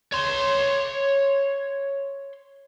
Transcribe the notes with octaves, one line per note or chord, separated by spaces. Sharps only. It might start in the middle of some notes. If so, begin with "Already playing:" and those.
C#5 C6